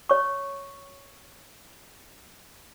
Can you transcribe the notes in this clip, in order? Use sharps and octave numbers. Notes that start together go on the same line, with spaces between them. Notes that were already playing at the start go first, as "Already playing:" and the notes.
C#5 C#6